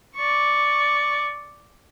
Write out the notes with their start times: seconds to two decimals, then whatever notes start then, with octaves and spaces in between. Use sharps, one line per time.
0.16 D5 C#6